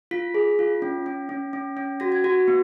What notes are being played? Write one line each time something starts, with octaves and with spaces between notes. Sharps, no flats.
F4 B6
G#4
F4
C#4
C#4
C#4
C#4
C#4
F#4 A#6
G#6
F#4 A#6
B3